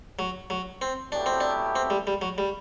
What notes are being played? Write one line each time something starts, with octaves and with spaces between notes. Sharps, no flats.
F#3
F#3
C4
B2 F#3 A3 D4 E4 G4
C4
D4
C4
G3
G3
F#3
G3